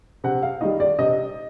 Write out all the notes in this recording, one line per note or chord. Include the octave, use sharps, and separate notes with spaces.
C3 F#5
F5
D#3 G3 D#5
D5
C3 D#5